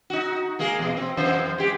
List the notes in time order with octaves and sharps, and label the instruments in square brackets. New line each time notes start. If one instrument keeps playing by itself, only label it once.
[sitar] D#4 F#4
G#3 A#3 G#4
E2 B2
C4
F2 E3 C5
G#3 G4